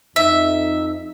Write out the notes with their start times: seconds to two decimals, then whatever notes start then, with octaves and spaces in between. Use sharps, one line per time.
0.16 F2 D#4 E5